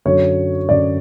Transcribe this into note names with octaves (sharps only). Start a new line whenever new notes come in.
F#2 D3 F#3 C#5
F#2 D3 F#3 D5